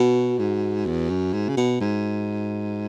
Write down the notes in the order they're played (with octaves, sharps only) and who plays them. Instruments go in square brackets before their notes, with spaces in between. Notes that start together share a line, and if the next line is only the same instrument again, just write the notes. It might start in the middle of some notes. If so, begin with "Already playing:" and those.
Already playing: [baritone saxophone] B2 [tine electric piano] F#4
[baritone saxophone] G#2
E2
F#2
G#2
C#3
B2
G#2